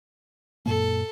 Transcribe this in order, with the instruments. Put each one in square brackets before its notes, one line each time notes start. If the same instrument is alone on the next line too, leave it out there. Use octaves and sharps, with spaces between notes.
[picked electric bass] F#2 A#2 A#3 [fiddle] A4